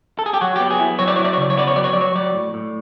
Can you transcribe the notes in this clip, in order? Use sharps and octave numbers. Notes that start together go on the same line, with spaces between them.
A4
G#4
G4
F#3 F#4
B3 G4
G#4
E4
F#3 C#5
D5
E4 C#5
D5
C#5
C#3 D5
C#5
B3 D5
C#5
F#3 D5
C#5
F#3 D5
C#5
F#3 D5
A2
A2